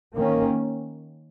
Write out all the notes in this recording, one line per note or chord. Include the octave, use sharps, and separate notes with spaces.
D#3 A#3 C#4